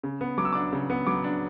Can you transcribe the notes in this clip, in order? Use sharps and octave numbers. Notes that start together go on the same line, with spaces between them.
C#3
B3
F#3 D6
E6
D4 D6
C#3
B3
F#3 D6
D4